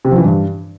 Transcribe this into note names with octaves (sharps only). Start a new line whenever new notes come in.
C3
F3
E3
G2